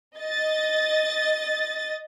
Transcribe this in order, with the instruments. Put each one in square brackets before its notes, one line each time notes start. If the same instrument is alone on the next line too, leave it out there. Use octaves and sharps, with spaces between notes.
[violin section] D#5 A6